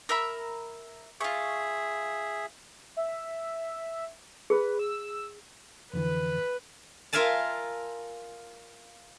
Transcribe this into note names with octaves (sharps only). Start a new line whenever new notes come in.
A#4 E5 B5
F4 G#4 E5 C#6
E5
G#4 B4
E6
F2 D3 E3 B4
F4 A#4 E5 F5 G#5 A5